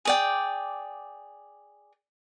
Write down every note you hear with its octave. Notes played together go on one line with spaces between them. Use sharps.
G#4 D5 G5